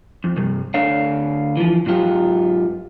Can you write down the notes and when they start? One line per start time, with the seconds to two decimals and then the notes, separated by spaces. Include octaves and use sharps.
0.24 F2
0.37 C2 G2
0.74 D2 D3 C#5 F5
1.57 E3 F3
1.86 G#2 F#3 F4 G4